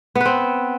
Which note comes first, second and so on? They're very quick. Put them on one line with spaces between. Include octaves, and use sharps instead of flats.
B3 B4 C4